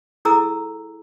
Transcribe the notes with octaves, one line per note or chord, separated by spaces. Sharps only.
E4 G#4 A4 A#5 D6 E6